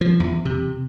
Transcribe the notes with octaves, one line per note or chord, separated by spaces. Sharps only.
F3
E2
C3